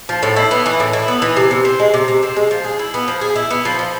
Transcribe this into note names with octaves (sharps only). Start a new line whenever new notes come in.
F3
A2
E4
B3
E3
A2
E4
B3
E3
C3
C3
C4
G#3
C3
C3
C4
G#3
F3
G#4
E4
B3
F3
G#4
E4
B3
F3
F3